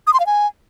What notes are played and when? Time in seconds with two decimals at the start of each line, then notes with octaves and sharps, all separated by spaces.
0.07 D#6
0.13 C6
0.20 F5
0.26 G#5